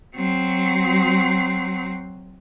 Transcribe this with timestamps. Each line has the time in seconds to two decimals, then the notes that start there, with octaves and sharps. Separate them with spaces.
0.15 F#3 C4